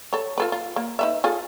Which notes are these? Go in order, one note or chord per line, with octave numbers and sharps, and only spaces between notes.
A4 C#5
F4 A4 B4
F4
A#3
D#4 B4 E5
F4 G#4 A4